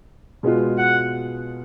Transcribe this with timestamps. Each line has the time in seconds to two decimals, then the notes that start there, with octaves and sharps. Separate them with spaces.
0.43 B2 G#3 B3 F4
0.78 F#5